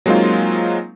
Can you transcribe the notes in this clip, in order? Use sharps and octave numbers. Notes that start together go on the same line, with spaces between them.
F#3 G#3 A#3 C4 D#4 F4